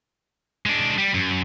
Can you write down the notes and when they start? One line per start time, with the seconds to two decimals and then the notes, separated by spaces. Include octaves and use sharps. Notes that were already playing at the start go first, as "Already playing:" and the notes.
0.66 G#3 D4
0.98 G3
1.14 F#2